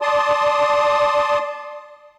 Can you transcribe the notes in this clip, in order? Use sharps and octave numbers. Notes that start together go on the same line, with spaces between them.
D5 A5 C6 D#6